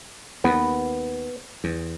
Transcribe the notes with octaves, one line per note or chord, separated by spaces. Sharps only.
D#2 B3 B4
E2